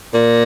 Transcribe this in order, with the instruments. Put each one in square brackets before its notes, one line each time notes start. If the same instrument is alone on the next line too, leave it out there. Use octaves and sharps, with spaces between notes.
[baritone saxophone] A#2